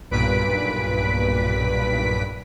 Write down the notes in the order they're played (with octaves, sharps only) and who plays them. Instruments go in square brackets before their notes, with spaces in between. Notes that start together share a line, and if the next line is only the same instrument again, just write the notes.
[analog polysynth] B1 G2 A#2 B4 B6 D7